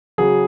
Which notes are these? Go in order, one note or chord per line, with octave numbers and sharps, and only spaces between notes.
C#3 F#3 G#4